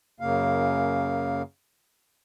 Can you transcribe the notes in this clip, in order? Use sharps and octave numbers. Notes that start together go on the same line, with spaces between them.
F#2 C#3 A#3 F5